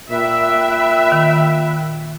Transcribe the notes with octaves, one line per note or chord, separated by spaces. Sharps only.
A#2 E5 G5 B5 F#6
D#3